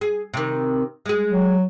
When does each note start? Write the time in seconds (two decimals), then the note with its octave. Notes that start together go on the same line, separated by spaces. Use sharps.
0.01 G#4
0.34 C3 D#3
1.06 G#3 G#4
1.32 F#3